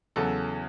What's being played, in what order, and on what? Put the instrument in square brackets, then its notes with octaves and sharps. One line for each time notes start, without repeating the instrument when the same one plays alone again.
[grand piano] E2 C#3 F#3 A4